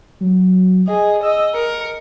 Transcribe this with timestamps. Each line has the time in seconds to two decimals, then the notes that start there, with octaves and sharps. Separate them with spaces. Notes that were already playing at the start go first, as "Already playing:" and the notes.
0.20 F#3
0.88 G#4 D#5
1.23 D#5 E6
1.55 A#4 C#7